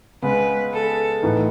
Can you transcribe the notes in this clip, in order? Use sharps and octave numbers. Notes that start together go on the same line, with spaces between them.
C#3 G#3 B3 B4
A4
A2 E3 B3 D#4